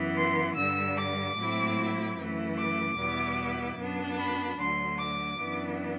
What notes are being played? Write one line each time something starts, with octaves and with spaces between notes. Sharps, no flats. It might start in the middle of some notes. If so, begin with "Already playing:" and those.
Already playing: F#2 E3 B3
C6
G2 D3 G3 E6
D6
A2 F#3 A3 C4 E4
F#2 E3 A3
D6
E2 B2 G3 B3 E4
F#2 F#3 B3 D4
B5
D2 D3 F#3 C6
D6
F#2 E3 B3 D4